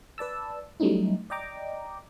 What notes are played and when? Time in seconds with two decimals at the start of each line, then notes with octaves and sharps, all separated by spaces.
0.18 B4 D5 A5 E6
0.80 F#3 G3 A3 C#4 D#4 E4
1.30 D5 D#5 G5 A#5 D6